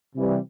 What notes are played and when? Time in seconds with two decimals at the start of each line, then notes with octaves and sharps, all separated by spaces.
0.16 C3 E3 G3